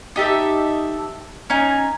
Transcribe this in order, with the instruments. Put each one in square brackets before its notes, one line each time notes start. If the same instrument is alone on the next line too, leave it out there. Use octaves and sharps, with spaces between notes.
[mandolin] D#4 G4 A4 E5
C#4 D#4 G#5